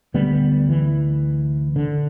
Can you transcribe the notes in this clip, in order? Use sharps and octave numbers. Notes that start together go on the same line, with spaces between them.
D2 D3 G3 B3
E3
D3